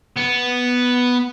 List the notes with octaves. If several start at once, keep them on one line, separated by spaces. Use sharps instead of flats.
B3